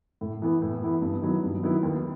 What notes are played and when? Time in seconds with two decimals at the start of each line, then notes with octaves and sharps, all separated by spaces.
0.21 A2
0.42 E3 B3 E4
0.62 A2
0.82 E3 B3 E4
1.02 G2
1.22 D#3 F#3 B3 E4
1.43 G2
1.63 D#3 F#3 B3 E4
1.83 D#2